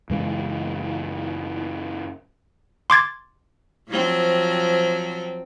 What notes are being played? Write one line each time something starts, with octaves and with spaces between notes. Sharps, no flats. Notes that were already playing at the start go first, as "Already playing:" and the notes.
F#2 C#3 E3 G#3
C6 D6 G#6 A6
F3 F#3 C4